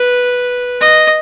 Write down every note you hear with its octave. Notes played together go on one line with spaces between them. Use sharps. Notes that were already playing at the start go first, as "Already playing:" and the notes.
Already playing: B4
D#5